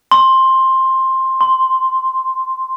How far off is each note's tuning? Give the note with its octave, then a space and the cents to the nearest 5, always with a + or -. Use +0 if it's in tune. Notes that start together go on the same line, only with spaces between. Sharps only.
C6 +10
C6 -5